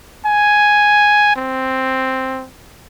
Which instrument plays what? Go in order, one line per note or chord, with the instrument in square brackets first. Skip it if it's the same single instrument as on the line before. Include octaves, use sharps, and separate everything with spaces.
[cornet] G#5
C4